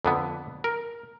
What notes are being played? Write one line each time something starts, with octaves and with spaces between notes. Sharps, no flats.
F2 D3 B3
A#4